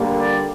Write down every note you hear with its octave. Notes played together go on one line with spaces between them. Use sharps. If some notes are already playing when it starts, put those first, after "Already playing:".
Already playing: D3 G3 A#3
D5